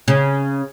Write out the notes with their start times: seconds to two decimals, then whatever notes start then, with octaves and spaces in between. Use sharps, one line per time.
0.08 C#3